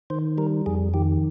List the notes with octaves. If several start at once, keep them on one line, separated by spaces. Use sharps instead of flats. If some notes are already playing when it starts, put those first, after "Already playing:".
D#3 C5
G3 A#4
F2 G#4
D#3 G4